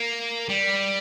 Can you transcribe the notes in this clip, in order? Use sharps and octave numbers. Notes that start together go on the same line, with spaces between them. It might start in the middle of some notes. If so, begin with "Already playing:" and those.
Already playing: A#3
G3